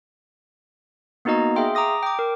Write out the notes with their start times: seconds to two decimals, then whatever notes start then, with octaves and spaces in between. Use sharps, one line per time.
1.25 A#3 B3 D#4 F#4 D#5 A#5
1.56 G#4 E5 F5 G5 C6
1.75 A#5 D6 D#6 A#6
2.03 G5 D6
2.19 A#4